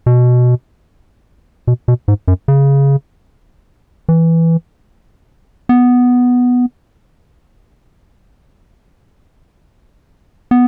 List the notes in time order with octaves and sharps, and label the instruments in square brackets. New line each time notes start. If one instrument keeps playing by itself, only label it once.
[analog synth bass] B2
B2
B2
G#2
F#2
C#3
E3
B3
B3